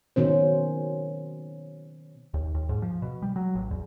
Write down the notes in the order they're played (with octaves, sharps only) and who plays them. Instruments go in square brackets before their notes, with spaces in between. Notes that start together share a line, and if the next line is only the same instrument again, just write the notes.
[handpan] B2 D#3 C#4 C5
[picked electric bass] D#2
D#2
G#2
F3
B2
G3
F#3
A1
E2